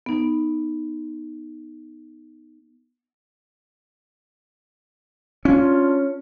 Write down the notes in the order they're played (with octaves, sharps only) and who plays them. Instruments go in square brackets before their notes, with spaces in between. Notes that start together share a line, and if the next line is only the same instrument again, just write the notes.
[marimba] B3 D#4
[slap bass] C#4 [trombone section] D4 F4